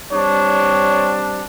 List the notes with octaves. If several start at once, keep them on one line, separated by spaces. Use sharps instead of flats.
G3 C4 D4 C#5